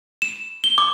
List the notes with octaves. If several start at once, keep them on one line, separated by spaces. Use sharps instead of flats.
E7
G7
D6